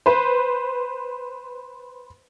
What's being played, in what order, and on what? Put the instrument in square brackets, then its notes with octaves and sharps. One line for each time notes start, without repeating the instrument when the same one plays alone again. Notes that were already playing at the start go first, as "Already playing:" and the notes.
[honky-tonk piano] B4 C5